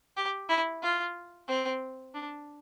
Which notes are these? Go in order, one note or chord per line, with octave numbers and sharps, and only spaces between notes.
G4
E4
F4
C4
D4